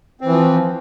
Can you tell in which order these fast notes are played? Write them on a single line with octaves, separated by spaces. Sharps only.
C4 E3 F3